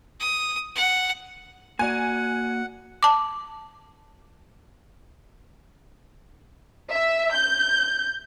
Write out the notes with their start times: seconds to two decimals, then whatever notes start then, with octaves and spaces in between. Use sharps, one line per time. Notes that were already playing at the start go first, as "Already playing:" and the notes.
0.20 D#6
0.75 F#5
1.79 A#3 F#4 D5 F#5 G#5
3.03 A5 D6
6.90 E5
7.33 G6